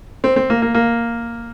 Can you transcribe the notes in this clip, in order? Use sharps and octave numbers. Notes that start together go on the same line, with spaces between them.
C4
C4
A#3
A#3
A#3